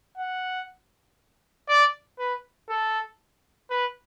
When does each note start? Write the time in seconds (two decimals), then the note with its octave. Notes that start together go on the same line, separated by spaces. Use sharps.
0.17 F#5
1.69 D5
2.19 B4
2.69 A4
3.70 B4